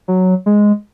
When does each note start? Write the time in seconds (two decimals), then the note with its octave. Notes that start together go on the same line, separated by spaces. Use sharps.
0.08 F#3
0.46 G#3